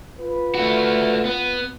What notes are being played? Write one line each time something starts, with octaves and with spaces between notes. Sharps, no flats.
F4 B4
A3 F#4
B3